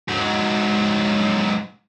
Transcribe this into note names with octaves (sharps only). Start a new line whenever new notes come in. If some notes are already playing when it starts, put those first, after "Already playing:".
G#2 F#3